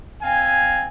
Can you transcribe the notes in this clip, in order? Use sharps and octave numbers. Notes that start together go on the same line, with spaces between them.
C4 F5 G#5